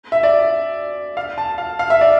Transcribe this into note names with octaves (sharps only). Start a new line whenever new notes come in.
E5
D5
F5
A5
F5
F5
E5
D5